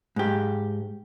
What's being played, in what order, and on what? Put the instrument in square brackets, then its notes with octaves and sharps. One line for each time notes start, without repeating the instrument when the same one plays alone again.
[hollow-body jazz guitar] G#2 G4